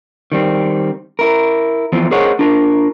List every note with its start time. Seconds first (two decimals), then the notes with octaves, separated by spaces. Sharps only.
0.32 D#3 G3 C4
1.19 E4 A#4
1.93 E2 F3 C4 E4
2.11 G#4 A#4 C5 C#5 D#5 F#5
2.39 D4 F4 A#4